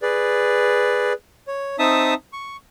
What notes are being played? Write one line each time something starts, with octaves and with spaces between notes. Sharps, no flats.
G#4 B4 D5
C#5
C4 D#4 E5 A5 D#6
C#6